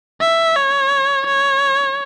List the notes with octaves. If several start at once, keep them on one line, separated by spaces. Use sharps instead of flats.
E5
C#5
C#5